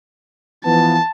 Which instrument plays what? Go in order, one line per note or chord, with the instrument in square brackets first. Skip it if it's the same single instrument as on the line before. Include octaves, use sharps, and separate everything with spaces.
[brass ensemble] E3 F3 B3 [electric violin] A5